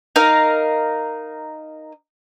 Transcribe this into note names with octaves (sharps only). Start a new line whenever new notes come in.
D#4 A#4 F5